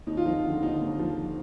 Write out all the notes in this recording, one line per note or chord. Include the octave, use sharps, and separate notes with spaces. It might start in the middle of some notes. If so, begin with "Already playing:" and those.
D#2 D#4
F4
F3 D#4
D3
D#2 D#4
D#2
F3